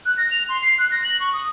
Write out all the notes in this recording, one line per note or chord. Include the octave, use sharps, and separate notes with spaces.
F#6
A#6
F7
C6
C7
F#6
A#6
F#7
C#6
D#6